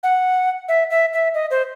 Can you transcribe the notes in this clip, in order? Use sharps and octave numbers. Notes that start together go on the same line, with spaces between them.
F#5
E5
E5
E5
D#5
C5